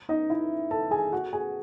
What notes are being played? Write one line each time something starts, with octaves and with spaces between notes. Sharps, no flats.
D#4 D#5
E4 E5
A4 A5
G#4 G#5
F#4 F#5
G#4 G#5